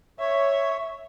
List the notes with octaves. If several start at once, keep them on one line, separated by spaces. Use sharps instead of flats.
C#5 E5